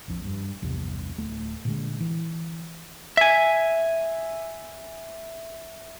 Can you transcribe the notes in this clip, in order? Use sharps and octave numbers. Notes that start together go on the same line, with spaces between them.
A#1 F2 F3
G2
A#1 E2 G2 C3
D1 A3
A#2 D3 G#3
E3
E5 G#5